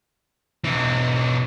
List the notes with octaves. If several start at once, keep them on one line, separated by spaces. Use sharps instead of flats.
B1 E3